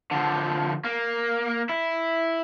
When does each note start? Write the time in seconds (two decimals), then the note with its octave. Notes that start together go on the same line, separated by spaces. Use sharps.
0.12 D3 F3
0.84 A#3
1.69 E4